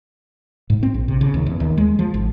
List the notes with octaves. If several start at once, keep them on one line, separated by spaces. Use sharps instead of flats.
G#2
C4
A#1
C3
C#3
D#2
E2
D#2
G#3
F3
G#1